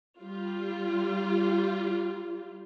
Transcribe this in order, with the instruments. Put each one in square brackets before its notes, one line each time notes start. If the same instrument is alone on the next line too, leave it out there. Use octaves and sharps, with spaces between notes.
[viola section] G3 F4